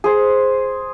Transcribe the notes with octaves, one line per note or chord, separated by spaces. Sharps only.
G#4 C5